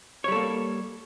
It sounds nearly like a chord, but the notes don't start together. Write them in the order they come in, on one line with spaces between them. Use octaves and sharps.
C#5 G3 A4 A#3